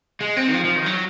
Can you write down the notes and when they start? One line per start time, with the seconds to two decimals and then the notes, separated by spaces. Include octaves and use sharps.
0.21 G#3
0.37 C4
0.48 D#3
0.54 F3
0.64 F3
0.76 D#3
0.86 F#3